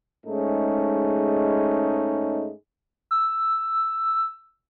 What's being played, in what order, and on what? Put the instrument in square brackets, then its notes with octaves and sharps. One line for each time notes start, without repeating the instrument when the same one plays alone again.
[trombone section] G#2 G#3 A3 C#4 D#4
[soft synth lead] E6